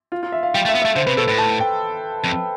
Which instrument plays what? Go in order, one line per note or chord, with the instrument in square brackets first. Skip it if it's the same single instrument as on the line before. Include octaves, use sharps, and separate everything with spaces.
[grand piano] F4
F4
E5
F5
[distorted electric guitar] G3 [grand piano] G5
[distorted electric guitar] A3
[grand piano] E5
[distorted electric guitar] B3
[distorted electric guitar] A3 [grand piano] E5
[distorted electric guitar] D3 [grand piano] C5
[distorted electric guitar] C3 [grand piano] B4
[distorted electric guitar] B2 [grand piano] A4
[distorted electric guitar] A2 [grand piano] B4
[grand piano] A5
G5
[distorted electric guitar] F2